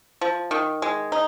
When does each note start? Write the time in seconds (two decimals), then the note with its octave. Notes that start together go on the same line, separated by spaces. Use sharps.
0.21 F3
0.51 D#3
0.82 G#3
1.12 D#4